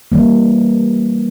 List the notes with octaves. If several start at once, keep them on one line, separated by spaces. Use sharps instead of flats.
E3 G3 A#3